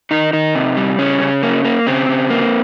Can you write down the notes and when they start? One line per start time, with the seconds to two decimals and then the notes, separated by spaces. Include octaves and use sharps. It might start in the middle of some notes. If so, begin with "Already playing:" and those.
0.11 D#3 D#4
0.33 D#3 D#4
0.55 C3
0.77 G3
0.99 C#3 C#4
1.21 C#3
1.43 A#3
1.65 A#3
1.87 C#3 C4
2.09 C#3
2.30 A#3